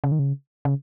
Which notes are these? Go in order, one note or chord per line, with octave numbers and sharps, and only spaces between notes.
C#3
D#3
C#3
C#3